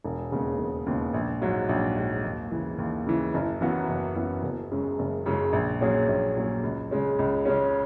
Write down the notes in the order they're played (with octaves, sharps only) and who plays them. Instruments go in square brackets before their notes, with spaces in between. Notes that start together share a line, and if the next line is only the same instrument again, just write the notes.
[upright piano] E1
D#2 C#3 G#3 B3
E1
D#2 C#3 G#3 B3
A#1
G#2 F#3
A#1
G#2 F#3
D#2
C#3 E3
D#2
C#3 E3
F#1
F#2 E3 B3 F#4
F#1
F#2 E3 B3 F#4
F#1
F#2 C#3 G#3
F#1
F#2 C#3 G#3
A#1
A#2 F#3 C#4 G#4
A#1
A#2 F#3 C#4 G#4
C#2
C#3 G#3 C#4
C#2
C#3 G#3 C#4